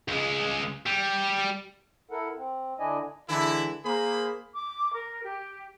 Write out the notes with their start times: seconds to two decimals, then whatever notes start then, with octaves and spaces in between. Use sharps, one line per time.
0.08 C#2 G#3
0.86 G3
2.11 E4 A4 A#4 F#5
2.36 C4
2.79 D3 D4 E4 D5 D#5 G#5
3.29 D3 E3 G#3 E4
3.85 A#3 G#4 A#4 C5 B5
4.54 D6
4.92 A#4
5.23 G4